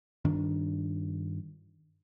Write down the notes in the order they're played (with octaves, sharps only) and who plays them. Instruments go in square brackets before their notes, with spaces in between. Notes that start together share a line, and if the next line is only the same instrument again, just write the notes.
[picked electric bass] G2 D#3 D4